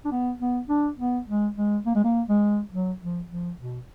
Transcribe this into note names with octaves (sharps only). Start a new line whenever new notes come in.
D4
B3
B3
D4
B3
G#3
G#3
A#3
G#3
A#3
G#3
F#3
F3
F3
B2